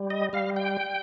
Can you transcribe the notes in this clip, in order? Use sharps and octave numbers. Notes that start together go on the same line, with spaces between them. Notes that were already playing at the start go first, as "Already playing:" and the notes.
Already playing: G3
D#5
G3 F5
G5